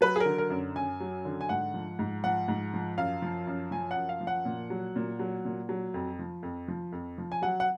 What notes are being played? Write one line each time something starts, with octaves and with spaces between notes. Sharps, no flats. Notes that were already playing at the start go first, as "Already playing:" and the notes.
F#3 B4
G#4
D3 A#4
A#4
F#2
F#2 G#5
F#3
D3
G#5
G#2 F#5
F3
G#2
F3 F#5
G#2
F3
F#2 F5
F3
F#2
F3 G#5
F#5
F#2
F5
F3
F#5
A#2
F#3
A#2
F#3
A#2
F#3
F2
F3
F2
F3
F2
F3
G#5
F#3 F#5
F#5